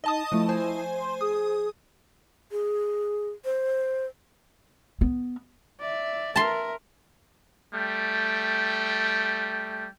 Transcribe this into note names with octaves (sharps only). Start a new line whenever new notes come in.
D#4 D#5 A5 D#6
F3 A3 E4
C5 G#5
C6
G#4 D#6
G#4
C5
B3
D5 E5
A#4 E5 A5 C6
G3 A3 G5